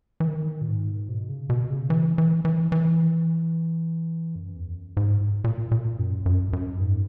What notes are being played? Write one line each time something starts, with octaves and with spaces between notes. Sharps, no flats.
E3
D#3
A#2
G#2
B2
C#3
B2
C#3
E3
E3
E3
E3
F#2
E2
F#2
G#2
A#2
A#2
F#2
F#2
F#2
G#2